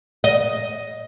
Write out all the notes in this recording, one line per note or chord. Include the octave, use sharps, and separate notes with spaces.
D#5